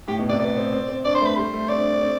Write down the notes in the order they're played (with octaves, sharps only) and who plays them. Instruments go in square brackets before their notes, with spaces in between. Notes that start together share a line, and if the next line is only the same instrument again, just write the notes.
[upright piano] A2 [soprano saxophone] G4
[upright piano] B2
[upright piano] C3 [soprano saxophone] D5
[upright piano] B3 [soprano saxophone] D5
[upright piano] C4
C4
C4
[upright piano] D4 [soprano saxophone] D5
[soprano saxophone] C5
[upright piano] A3 [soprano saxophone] B4
[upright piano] G3 [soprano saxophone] C5
[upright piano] A3
[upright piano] C4 [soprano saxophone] D5
[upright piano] D4
D4
C4